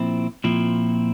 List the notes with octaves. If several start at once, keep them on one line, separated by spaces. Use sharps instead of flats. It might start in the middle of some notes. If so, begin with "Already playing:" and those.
Already playing: A#2 F3 C4 E4
A#2 F3 C4 E4